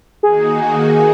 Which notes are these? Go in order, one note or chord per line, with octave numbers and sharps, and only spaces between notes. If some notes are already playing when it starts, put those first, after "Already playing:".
D#3 A#3 D#4 F#4 G#4